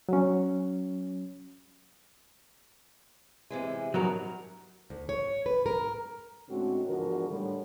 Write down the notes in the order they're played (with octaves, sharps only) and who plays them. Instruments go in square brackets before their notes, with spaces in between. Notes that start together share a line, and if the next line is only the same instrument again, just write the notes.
[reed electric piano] F#3 C#4
[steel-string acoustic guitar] C3 E3 G#3
[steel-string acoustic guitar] G2 C#4 D#4 [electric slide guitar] F#3 F#4 A#4
[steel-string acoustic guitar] D2
C#5
B4
A#4
[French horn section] A2 D3 G#3 C4 C#4 F#4
E2 G#2 D3 F3 F#4 A#4
A2 D3 G3